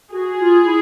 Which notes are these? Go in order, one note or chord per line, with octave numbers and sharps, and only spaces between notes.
F#4 G#4
F4
E4